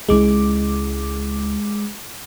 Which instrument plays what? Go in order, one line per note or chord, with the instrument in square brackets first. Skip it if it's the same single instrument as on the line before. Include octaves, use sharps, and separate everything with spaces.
[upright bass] C#2 E4 [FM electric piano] G#3 D6